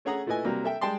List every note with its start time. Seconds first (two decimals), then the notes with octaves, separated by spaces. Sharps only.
0.05 A3 C#4 G#4 F#5 A#5 D#6
0.26 A#2 A3 E4 B4 D#5 G#5
0.45 C3 F#3 G3 A#3
0.64 A4 E5 G5
0.81 G3 G#3 G5 A5 C6